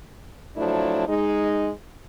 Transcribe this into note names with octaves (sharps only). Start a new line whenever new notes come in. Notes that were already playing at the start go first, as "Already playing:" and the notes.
F3 F#3 A3 D4 E4
G#3 D#4